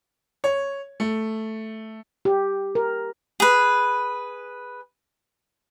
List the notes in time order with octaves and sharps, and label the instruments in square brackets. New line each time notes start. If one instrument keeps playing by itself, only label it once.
[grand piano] C#5
A3
[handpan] G4
A#4
[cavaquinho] G#4 B4